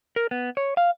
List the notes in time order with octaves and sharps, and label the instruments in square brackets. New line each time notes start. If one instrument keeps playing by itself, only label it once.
[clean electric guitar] A#4
B3
C#5
F5